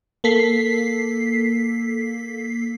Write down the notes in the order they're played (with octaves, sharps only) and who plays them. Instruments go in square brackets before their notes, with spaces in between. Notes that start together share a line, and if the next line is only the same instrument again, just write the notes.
[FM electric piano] A#3 A4 B6 C7